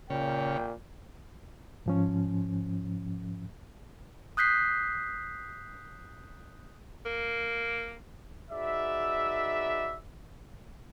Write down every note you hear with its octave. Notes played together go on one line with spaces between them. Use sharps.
A#2 C#3 G5
G#2 F3 C#4
D#6 F#6 G6 B6 C7
A#3
D#4 F#4 G#4 B4 D5 E5